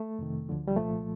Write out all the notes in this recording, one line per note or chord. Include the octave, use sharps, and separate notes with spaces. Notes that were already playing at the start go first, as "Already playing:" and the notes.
Already playing: A3
F2 C3 D#3
D2 D3 F3
G3
C2 A#2 F3 A3